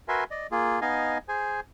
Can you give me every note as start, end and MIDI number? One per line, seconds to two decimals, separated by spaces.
0.08 0.24 66
0.08 0.24 70
0.08 0.24 71
0.08 0.24 76
0.08 0.24 80
0.08 0.24 84
0.31 0.47 74
0.31 0.47 75
0.51 0.80 58
0.51 0.80 65
0.51 0.80 68
0.81 1.18 59
0.81 1.18 63
0.81 1.18 75
0.81 1.18 77
0.81 1.18 80
1.28 1.60 68
1.28 1.60 72
1.28 1.60 80